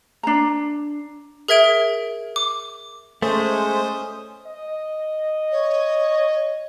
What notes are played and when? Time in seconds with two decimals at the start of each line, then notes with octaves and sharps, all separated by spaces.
0.23 D4 A#5
1.48 G#4 A#4 E5 G#6 D7
2.36 D6
3.22 G#3 A3 C#4 C5 D#6
4.47 D#5
5.52 C#5